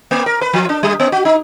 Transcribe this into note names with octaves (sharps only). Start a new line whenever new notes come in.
A#3
A#4
B4
F3
D4
G3
B3
F#4
D#4